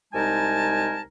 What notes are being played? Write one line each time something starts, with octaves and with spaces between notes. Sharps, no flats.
C2 G#3 D#4 A#4 G#5 A5